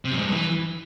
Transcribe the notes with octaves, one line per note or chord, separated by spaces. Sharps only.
C3
F#2
G#2
G2
E3